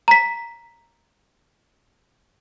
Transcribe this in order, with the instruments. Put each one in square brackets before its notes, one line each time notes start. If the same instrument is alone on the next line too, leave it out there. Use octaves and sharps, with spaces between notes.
[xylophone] A#5 B6